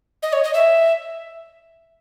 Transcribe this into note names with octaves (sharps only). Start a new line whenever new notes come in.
D#5
C#5
D#5
E5